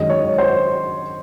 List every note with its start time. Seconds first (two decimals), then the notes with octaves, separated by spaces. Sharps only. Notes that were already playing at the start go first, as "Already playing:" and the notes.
Already playing: F#2 D#3 G#3 D#5
0.10 C#5
0.38 C5